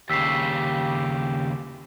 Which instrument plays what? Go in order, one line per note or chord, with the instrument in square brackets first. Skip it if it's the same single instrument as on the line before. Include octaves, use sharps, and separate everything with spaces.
[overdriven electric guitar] D#2 C#3 [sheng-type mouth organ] G4 [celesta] E6 B6 C7